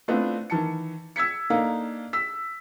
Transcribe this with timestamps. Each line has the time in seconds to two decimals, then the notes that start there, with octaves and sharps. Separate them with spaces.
0.08 A3 B3 C4 D4 E4 F4
0.50 D#3 E3 A5 C#7
1.16 E6 G#6 B6 C#7
1.50 A#3 D4 D#4 A4 F5
2.13 E6 B6